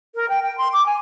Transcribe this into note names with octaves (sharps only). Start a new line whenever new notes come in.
A#4
G5
G5
C6
D6
G#5